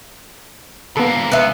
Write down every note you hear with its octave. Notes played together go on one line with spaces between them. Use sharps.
D3 A#3 B3 A4
C#2 B3 E5